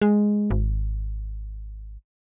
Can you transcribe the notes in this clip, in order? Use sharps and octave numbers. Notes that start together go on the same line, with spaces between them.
G#3
G#1